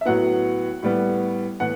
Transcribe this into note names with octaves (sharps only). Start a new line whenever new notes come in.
E5
A2 F#3 B3 F#5
A2 G3 B3
A2 E3 B3 F#5